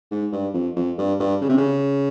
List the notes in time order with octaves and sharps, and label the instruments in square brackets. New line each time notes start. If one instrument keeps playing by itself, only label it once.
[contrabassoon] G#2
G2
F2
F2
G2
G2
C#3
C3
C#3